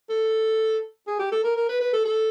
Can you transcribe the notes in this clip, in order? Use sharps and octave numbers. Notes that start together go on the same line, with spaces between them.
A4
G#4
G4
A4
A#4
A#4
B4
B4
A4
A4